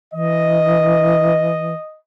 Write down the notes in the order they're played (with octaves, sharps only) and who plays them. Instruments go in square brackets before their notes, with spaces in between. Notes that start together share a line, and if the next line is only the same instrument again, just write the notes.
[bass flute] E3 [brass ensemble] D#5